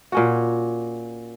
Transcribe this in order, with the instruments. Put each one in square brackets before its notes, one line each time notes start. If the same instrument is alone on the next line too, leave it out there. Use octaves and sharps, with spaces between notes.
[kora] A#2 C#4 F#4